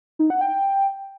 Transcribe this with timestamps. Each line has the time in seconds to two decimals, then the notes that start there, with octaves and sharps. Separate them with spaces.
0.19 D#4
0.30 F#5
0.41 G5